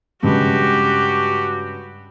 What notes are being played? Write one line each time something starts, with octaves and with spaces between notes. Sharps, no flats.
G2 C#3 G#3 F#4 G4